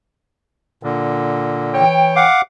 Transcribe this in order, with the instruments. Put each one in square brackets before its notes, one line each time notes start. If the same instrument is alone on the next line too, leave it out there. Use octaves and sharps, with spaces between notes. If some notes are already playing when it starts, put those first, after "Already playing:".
[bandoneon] A#2 D3
[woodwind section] E3 C#5 G5
[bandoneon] F5 F#5 D6